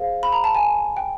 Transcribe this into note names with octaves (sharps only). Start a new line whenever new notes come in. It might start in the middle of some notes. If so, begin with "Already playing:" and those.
Already playing: G#4 C5 F5
B5
A#5
A5
G#5
G5